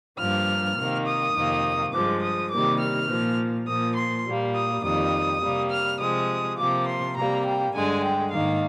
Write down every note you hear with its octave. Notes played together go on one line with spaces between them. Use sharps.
G2 F3 A#3 F6
C3 D#3 A#3
D#6
F2 C3 D#3 A#3
G2 F3 G#3 D6
D#6
C3 D#3 G3 A#3 D6
F6
A#2 F3 A#3
A#2 F3 A#3 D#6
C6
A#2 G3 A#3
D#6
F2 D#3 G3 A#3 D#6
C3 G3 A#3
F6
C3 F3 G#3 D#6
C3 F3 A#3 D6
C6
C3 G3 A#3 A#5
G5
G2 D3 G#3 G#5
G5
G#2 D#3 A#3 F5